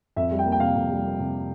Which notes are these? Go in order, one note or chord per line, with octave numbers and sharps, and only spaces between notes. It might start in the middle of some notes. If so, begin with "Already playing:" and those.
F2 E5
G3
G5
A#3
G5
C3 F5
F2
G3
A#3
C3